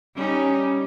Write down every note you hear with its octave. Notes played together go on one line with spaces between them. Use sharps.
G3 C#4 D#4